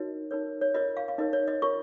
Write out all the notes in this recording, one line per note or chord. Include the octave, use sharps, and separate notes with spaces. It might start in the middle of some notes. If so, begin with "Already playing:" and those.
Already playing: D#4 F#4 A#4 C#5 D#5
D#4 A#4 C#5
C#5
F4 A#4 C#5 D#5
F5
F5
D#4 A#4 C#5 D#5
C#5
D#5
F4 A#4 C#5 C#6